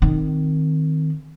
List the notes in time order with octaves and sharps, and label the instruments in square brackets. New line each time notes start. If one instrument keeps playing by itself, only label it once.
[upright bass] D#3 C4